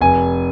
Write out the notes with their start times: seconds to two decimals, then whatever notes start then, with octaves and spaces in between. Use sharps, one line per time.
0.01 F1 G#5